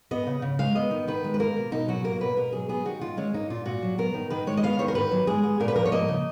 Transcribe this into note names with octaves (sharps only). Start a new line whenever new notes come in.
B3 D#5
C#3
C#3
G#3 F5
B3 D#5
D#3
D#3 B4
G#3
B4
A#3 A#4
B2
B2 D#4
F#3 F#4
A#3 A#4
B2 B4
B2 A#4
F#3 G#4
B3 G#4
D#3 F#4
D#3 F4
G#3 C#4
A#3 D#4
A#2 F4
A#2 F#4
F#3
B3 A#4
D#3
D#3 B4
G#3 C#5
D#5
B3 F5
D#3 C#5
A#4
D#3 B4
F#3
G#3 G#4
B3
A#2 A#4
B4
F3 A#4
C#5
A#3 D#5
C#3